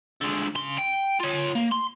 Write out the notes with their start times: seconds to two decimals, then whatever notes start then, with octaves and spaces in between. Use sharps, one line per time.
0.21 D3 G#3
0.55 C#3 C6
0.78 G5
1.20 F4 C#5
1.55 A#3
1.72 C6